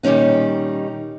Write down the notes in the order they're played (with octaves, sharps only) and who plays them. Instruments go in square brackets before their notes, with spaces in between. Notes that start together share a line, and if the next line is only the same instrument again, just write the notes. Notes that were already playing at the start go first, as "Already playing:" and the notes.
[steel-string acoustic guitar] A#2 D#3 G3 C#4 D#4